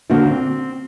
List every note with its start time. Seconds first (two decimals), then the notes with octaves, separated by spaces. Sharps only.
0.10 D#2 D3 A#3 F#4 C5 D5
0.32 C4